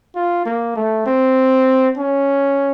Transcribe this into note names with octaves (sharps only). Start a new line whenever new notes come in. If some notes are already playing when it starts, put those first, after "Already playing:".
F4
A#3
A3
C4
C#4